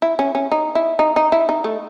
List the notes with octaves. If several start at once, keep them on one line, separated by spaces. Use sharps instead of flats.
E4
C#4
C#4
D#4
E4
D#4
D#4
E4
D#4
A3